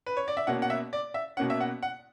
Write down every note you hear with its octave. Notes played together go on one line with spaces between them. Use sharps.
B4
C#5
D5
E5
B2 A#3 C#4 F#5
F#5
E5
D5
E5
B2 A#3 C#4 F#5
E5
F#5
F#5